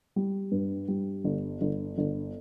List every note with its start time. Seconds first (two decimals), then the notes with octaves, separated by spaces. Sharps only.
0.16 G3
0.52 G2
0.88 G3
1.24 G1
1.61 G1
1.98 G1